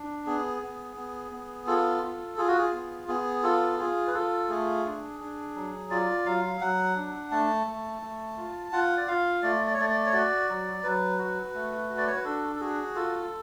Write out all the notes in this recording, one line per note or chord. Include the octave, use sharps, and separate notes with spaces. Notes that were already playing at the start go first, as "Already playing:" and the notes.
Already playing: D4
B3 G#4
B3
B3
B3
F4 A4
F4
F4 G#4
F#4
G#4
B3
B3 G#4
F4 A4
F4 G#4
B4
F4 A4
A3 G#4
D4
D4
F#3
F4 D5
F#3 F5
F#3 F#5
D4
A3 A5
A3
A3
F4
F4 F#5
D5
F4 F5
A3 D5
D5
C#5
A3 D5
D5
C#5
F#4 D5
F#3
F#3 B4
F#4
A3
F#4
D5
C#5
B4
D4 A4
A4
F#4 G#4
F4 A4